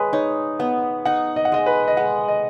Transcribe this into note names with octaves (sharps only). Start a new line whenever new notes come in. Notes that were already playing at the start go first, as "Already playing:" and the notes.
Already playing: G#3 B4 C#5
D#4 C#5
B3 F#5
D#4 F#5
D#5
F#5
G#3 D#5
B4
D#5
G#3 F#5
D#5